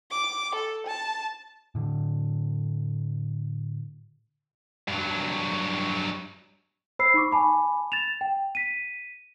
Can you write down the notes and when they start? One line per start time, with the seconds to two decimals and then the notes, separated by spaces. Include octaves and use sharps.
0.11 D6
0.55 A4
0.87 A5
1.75 A2 D3
4.88 G2 F#3
6.99 C5 B5 E6 C7
7.14 D#4 B5 C#6 D6
7.31 G#5 A5 B5 D6
7.92 A6 E7 F7
8.21 G5
8.55 B6 D#7